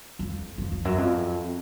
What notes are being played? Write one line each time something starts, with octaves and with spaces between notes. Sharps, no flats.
F2
F2
F2
F#2
F2